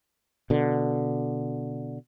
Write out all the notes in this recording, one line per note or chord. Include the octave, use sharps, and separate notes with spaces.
B2 D3